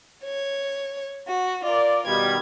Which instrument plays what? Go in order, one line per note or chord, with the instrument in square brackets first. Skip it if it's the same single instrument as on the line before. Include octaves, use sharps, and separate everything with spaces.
[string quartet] C#5
F#4
[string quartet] F4 A#4 [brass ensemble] D5
[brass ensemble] B2 D#3 G3 [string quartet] G#6